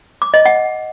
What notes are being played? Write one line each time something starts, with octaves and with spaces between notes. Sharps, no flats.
D6
D#5
F#5